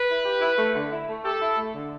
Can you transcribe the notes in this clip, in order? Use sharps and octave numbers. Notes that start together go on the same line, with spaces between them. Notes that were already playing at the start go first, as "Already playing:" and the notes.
Already playing: B4
E4
G4
E4
A3
D3
E4
A3
G4 A4
E4
A3
D3